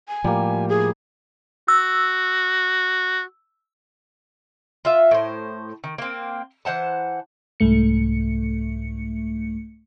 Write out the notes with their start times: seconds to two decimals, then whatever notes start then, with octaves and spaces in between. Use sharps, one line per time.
0.08 G#5
0.24 A2 F3 G3 A#3
0.69 G#4
1.68 F#4 E6
4.85 F4 E5
5.11 A2 C5
5.84 D#3
5.98 A#3 C4
6.65 E3 C5 F#5 A5
7.60 C2 G#2 A3 C#7